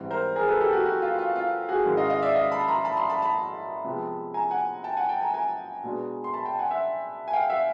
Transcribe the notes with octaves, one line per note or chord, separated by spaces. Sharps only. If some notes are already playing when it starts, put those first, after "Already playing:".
Already playing: G#2 E3 G3 C4
A#4 C5
G#4 A#4
A4 B4
G4 A4
F#4
F#4
F4
F4
F4
F#4 G#4
G#2 D#3 G#3 C#4 E4
D#5 F5
D#5 F5
D5 E5
D#5 F5
A5 B5
A#5 C6
A5 B5
A#5 C6
A5 B5
A5 B5
C3 F3 G#3 B3
G#5 A#5
F#5 G#5
G5 A5
F#5 G#5
G5 A5
G#5 A#5
G#5 A#5
B2 G#3 B3 D4
C6
A5 B5
G5 A5
F#5 G#5
E5 F#5
G#5
F5 G5
E5 F#5